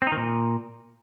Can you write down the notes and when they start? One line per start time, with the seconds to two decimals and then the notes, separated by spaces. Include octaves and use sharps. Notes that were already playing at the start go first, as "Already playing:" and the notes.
0.02 C4
0.07 D#4
0.12 D#3
0.17 A#2